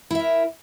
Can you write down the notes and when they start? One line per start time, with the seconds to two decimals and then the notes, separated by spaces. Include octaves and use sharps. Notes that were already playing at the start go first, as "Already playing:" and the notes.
0.11 E4
0.15 E5
0.19 A#4